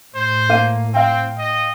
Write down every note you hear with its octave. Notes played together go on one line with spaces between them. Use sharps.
A2 C5
A#3 F5 D#7
C4 F5 G5
D#5